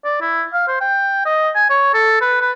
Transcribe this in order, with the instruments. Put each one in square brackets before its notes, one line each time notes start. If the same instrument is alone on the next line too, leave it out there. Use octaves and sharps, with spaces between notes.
[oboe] D5
E4
F5
C5
G5
D#5
G#5
C#5
A4
B4
B4